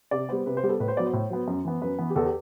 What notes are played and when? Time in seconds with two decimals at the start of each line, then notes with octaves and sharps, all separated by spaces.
0.11 C3 D5
0.29 G3 B3 C5
0.46 C3 B4
0.57 C5
0.63 G3 B3
0.69 A4
0.80 A2 B4
0.88 C5
0.97 F#3 B3 D5
1.06 C5
1.13 A2
1.30 F#3 B3
1.48 F#2
1.65 E3 B3
1.82 F#2 B4
1.99 E3 B3
2.10 G4
2.16 E2 A4
2.26 G4